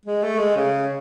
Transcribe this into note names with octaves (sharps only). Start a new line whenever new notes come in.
G#3
A3
G#3
C#3